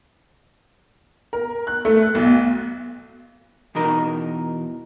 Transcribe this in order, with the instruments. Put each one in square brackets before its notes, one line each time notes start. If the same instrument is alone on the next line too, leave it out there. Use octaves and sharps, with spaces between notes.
[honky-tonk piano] A#4
F#6
A3
F#6
B1
[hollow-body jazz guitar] E2 B2 D#4 A#4